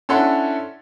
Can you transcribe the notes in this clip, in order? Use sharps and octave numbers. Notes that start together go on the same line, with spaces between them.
C#4 D4 E4 A4 F#5 C6